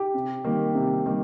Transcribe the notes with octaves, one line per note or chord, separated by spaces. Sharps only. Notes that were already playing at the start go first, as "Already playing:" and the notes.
Already playing: G4
C3
D#3 G3 A#3
C3
D#3 G3 A#3